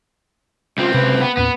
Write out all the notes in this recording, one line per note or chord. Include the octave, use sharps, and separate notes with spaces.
C#2 C4 F4
C3 B4
B3
D#2 A2 B3 C#4